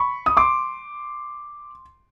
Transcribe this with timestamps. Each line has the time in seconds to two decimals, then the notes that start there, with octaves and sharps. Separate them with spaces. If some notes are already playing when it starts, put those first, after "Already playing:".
Already playing: B5 C#6
0.26 D#6
0.37 C6 D6